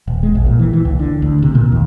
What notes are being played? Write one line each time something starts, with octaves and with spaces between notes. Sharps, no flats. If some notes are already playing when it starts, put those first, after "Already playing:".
D#1
G#3
A#1
A#2
E3
E3
C#2
D3
D2
C3
A#2
D#2